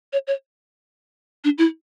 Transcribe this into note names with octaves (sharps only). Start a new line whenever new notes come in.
C#5
C#5
D4
E4